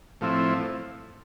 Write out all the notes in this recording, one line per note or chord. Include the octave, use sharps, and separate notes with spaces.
A2 F3 C4 E4